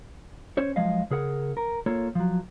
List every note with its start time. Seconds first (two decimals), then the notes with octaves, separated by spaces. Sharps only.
0.57 C#4 C5 C#5
0.76 F3 F#3 G#3 D#5 F5
1.11 C#3 G#4 A#4 F#5
1.57 A#4
1.86 A#3 F4 A4 C#5
2.15 F3 F#3